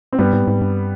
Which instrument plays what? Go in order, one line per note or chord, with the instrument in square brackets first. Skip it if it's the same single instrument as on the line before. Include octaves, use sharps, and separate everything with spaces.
[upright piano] C4
[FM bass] G2 [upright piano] G3 B3
[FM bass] G#2
G#2
G2